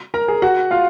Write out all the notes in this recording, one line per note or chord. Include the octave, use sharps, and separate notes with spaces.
A#4 A#5
G#4 G#5
F#4 F#5
F4 F5